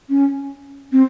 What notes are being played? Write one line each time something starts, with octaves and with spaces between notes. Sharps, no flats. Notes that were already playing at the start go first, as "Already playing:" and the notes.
C#4
C4